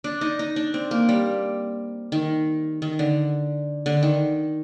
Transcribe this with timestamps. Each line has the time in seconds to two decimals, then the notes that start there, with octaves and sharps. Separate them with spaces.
0.04 D4
0.21 D#4
0.39 D#4
0.56 D4
0.74 C4
0.91 A#3
1.09 G3
2.12 D#3
2.82 D#3
2.99 D3
3.86 D3
4.03 D#3